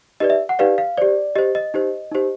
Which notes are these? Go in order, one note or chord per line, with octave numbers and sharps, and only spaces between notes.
D#4 G4 B4 D5 D#5
E5
F#5
D#4 G4 B4 D5 F5
F5
G4 C5 D5
G4 C5 D#5
D#5
D#4 G4 C5
D#4 G4 C5